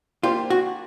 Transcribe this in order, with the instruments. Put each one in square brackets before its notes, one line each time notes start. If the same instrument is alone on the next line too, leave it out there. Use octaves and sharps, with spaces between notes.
[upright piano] A#3 D4 G4 C5 [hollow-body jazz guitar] F4
[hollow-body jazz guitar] F#4